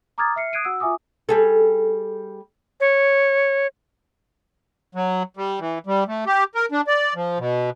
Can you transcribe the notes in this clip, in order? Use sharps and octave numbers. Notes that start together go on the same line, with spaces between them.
A#5 D6 D#6 F6 G#6 A6
E5 F6 C7 C#7
D#6 F#6 G#6 C7 D7 D#7
F#4 F#5 E6
F4 E5 G#5 D6 D#6
G3 G#4 A4
C#5
F#3
G3
E3
G3
A3
G4
A#4
D4
D5
F3
B2